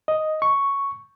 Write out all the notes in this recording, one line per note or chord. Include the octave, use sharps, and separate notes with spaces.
D#5
C#6